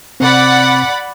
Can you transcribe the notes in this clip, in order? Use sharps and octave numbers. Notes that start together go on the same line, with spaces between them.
C3 C4 D5 F#5 B5